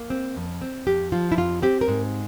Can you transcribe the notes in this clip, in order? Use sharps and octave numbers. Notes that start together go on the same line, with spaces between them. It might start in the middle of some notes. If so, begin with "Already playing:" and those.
Already playing: A#3
C4
F2
C4
F2 G4
F3 F4
E4
F2 F4
C4 G4
A#4
G#2